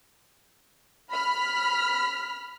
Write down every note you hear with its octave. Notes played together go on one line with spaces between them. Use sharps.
B5 F6 B6